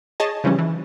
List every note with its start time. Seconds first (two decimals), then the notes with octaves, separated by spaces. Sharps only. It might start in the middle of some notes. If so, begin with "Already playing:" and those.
0.20 G#4 C#5 D#5 A5
0.44 C#3 E3 F3 G3 C#4
0.59 E3